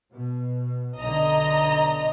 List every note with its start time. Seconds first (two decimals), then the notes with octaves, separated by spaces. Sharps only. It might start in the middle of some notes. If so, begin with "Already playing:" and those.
0.12 B2
1.00 B1 D3 D#5 A#5